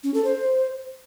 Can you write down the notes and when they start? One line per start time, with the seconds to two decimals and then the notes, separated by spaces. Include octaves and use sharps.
0.04 C#4
0.14 A4
0.24 C5